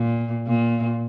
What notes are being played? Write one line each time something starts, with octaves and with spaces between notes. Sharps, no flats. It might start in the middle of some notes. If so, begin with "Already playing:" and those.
Already playing: A#2
A#2